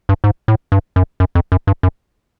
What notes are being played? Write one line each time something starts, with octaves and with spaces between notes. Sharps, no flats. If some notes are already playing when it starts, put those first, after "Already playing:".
G2
G#2
A2
G2
F#2
F#2
F2
F#2
G2
F#2